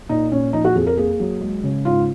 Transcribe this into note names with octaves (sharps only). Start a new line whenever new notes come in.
A#2 D#4
A#2 C#4
F3 D#4
F#4
F2 G#4
A#4
A#3 G#4
F#3
G#3
C#3
G#2 F4